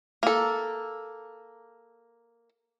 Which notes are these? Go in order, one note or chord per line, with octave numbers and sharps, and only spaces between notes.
A#3 A4